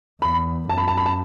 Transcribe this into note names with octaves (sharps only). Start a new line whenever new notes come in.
E2 B5
F#2 A5
B5
A5
B5
A5